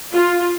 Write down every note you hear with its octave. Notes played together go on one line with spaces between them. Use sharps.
F4